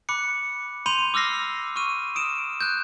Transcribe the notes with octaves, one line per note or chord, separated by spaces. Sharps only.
B5 D6 F#6 C#7
B5 C6 G6 D#7 F7
D6 E6 F6 A#6 C7
C#6 F6 D#7
D#6 D7 E7
F#6 G6